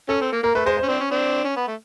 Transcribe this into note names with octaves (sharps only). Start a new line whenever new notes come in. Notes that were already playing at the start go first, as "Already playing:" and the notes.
C#4 A4
C4
A#3
A#3 A#4
A3 B4
G#3 C5
C5
C#4
C4 D4
C#4
C4 D4
C#4
B3
A3